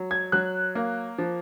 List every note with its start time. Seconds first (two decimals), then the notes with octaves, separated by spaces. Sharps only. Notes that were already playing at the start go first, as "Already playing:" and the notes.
Already playing: F#3
0.11 G#6
0.32 F#3 F#6
0.75 A#3
1.18 F3